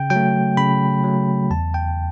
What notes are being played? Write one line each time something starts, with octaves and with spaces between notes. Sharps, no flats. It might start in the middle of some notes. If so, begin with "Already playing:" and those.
Already playing: C#3 G5
F#3 G5
A3
C#3 B5
F#3 A3
E2 A5
G5